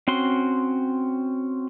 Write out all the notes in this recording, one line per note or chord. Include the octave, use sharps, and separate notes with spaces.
C4 C#4 F#4 C6